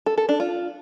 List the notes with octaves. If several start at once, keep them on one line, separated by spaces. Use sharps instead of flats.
A4
A4
D4
F4